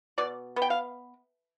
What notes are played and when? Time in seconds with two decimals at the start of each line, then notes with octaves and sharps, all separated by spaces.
0.18 B2 D5
0.56 B3
0.62 G5
0.70 F5